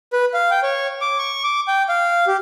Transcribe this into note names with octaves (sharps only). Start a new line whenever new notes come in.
B4
F5
G5
C#5
D6
C#6
D6
G5
F5
G4